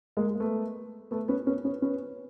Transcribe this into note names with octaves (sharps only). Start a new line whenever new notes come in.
G#3 A#3
A#3
A3 B3
A3 B3
B3 C#4
B3 C#4
B3 C#4
B3 C#4